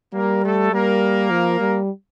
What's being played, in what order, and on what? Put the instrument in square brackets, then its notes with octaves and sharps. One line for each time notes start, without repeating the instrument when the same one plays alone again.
[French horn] G3 [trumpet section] A#3 A#4
[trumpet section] A3 A4
[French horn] G3 [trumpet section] A#3 A#4
[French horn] F3
G3